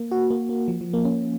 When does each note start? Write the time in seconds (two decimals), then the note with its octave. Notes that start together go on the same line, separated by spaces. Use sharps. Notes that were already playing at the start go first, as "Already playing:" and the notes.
Already playing: A#3
0.11 F#4
0.30 A#3
0.49 A#3
0.68 F3
0.81 F3
0.93 A#3
1.05 C#4